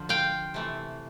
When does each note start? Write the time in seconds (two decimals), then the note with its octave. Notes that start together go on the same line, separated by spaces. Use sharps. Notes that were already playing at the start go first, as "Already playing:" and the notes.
Already playing: D3 F3
0.09 F5 G5
0.54 C3 E3 A3